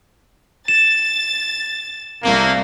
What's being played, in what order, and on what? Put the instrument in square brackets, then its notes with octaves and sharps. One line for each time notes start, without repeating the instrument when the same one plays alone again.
[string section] A6 [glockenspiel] E7
[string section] C2 C3 [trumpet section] A3 A#3